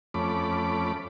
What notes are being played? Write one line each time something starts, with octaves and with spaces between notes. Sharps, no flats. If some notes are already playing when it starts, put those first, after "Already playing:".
F2 A3 C#4 B5 D6